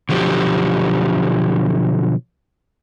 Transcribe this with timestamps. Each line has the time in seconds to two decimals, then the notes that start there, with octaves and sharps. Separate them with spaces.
0.09 B2 D3 F3 F#3 G4